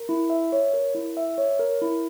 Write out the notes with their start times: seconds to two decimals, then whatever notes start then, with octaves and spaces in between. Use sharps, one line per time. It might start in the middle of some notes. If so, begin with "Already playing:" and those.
Already playing: A#4
0.09 E4
0.30 E5
0.52 C#5
0.74 A#4
0.95 E4
1.17 E5
1.38 C#5
1.59 A#4
1.82 E4